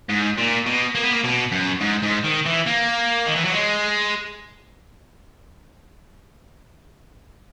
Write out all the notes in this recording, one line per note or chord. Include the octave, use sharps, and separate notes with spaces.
G#2
A#2
B2
A#3
B3
A#3
B2
F#2
G#2
G#2
D#3
E3
A#3
D#3
E3
F#3
G#3